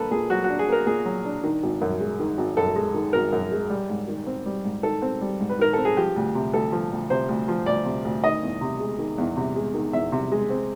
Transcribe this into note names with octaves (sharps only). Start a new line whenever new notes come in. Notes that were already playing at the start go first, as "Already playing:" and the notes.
Already playing: A#3 D4 A4 B4
A#2 G#4
F#3 F#4
F#4
D4
G#4
A#3 A#4
A#2 G#4
F#3
D4
D#3
G#1
F#2
G#3
D#3
G#1
F#2 A4
G#3
D#3
G#1 A#4
F#2
G#3
G3
G#2
D#3
C4
G3
G#2
D#3 A4
C4
G3
G#2
B4
D#3 A#4
C4 A4
G#4
F3 G4
D2
C3
D2 A4
F3
D2
C3 C5
D2
F3
D2 D5
C3
D2
D#3 D#5
E2
C3
G#3
D#3
E2
C3
G#3
D#3
E2 E5
C3
G#3
C4